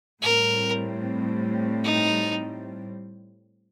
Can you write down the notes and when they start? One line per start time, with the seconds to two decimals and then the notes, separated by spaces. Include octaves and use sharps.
0.22 A2 G3 C4 A#4
1.84 D#4